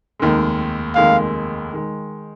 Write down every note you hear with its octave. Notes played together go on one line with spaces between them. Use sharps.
F1 D#2 D#3 G#3
F1 D#2 D#3 G#3 F5
D#3 G#3